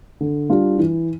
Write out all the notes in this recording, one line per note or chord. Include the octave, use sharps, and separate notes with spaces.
D3
G3 D4 F4
E3